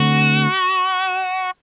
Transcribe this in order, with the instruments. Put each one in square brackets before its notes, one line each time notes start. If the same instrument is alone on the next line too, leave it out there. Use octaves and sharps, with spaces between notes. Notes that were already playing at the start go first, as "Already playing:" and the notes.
Already playing: [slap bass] D3 A3 C4 [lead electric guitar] F#4